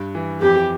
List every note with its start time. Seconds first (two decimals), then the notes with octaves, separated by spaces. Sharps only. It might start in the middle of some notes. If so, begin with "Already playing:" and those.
Already playing: G2
0.15 E3
0.42 F2 G4